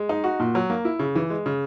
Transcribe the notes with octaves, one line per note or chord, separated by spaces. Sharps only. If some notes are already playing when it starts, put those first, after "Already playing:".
Already playing: G#3
D#4
F#4
A#2
F#3
A#3
E4
C#3
E3
G#3
C#3